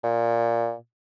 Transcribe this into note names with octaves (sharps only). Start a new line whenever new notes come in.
A#2